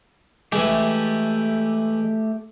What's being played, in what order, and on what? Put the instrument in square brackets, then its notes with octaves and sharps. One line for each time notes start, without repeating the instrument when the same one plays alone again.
[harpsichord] E3 G#3 [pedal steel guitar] A3 G4